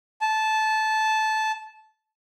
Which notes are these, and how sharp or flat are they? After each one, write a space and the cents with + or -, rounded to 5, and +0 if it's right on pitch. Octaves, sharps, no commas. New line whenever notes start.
A5 -15